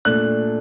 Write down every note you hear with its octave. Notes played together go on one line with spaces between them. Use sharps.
A#2 A3 D4 F#6